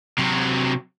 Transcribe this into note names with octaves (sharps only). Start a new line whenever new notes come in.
C3 F#3